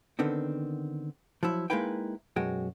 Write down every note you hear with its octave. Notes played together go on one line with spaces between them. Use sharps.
D3 D#3 B3 C4
F3 F#3 E4
G#3 A#3 D#4 E4 B4 G5
B1 F#2 G#3 F#4 G5